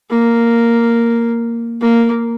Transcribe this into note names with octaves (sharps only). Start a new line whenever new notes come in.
A#3
A#3